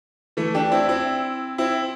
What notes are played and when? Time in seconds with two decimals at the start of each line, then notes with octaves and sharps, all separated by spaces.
0.37 E3 A3
0.54 D4 G4
0.72 C4 E4
0.89 C4 E4
1.58 C4 E4